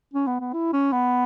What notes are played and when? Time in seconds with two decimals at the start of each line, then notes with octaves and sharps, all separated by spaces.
0.14 C#4
0.27 B3
0.40 B3
0.53 E4
0.73 C#4
0.93 B3